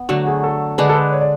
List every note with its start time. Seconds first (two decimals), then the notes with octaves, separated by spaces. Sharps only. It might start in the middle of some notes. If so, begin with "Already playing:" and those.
Already playing: B3
0.09 D3 F#3 A3 F#4
0.26 G#4
0.44 A4
0.78 D3 G#3 D4 B4
0.89 A4
0.95 B4
1.12 C#5
1.21 D5